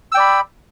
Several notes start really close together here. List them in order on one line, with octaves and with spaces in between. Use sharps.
E6 G5 D5 B5